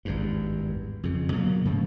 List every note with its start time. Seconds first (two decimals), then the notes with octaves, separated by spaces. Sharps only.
0.05 G#1 E2 G2
1.03 F2 C#3
1.32 B2 F#3 A3 A#3
1.65 G#2 C#3 F3